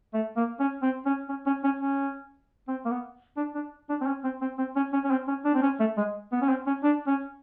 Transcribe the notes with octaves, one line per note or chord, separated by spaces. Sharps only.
A3
A#3
C#4
C4
C#4
C#4
C#4
C#4
C#4
C4
A#3
B3
D4
D4
D4
C4
C#4
C4
C4
C4
C#4
C#4
C#4
C4
C#4
D4
C4
C#4
A3
G#3
B3
C#4
C4
C#4
D4
C#4